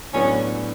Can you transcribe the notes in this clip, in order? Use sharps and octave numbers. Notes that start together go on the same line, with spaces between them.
A2 F#3 B3 C#4 D4